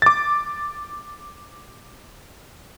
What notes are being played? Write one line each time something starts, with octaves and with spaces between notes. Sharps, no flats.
D6 A6